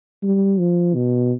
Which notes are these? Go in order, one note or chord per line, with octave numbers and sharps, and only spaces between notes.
G3
F3
B2